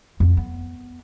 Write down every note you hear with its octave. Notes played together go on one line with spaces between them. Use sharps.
F2
B3